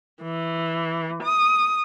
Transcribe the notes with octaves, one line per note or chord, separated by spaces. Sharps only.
E3
D#6